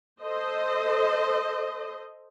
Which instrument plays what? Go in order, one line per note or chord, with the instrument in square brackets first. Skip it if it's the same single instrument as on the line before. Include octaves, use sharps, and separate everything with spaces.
[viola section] A4 C5 D#5